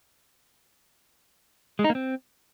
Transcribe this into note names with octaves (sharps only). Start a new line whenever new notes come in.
G#3
D#4
A#3
C4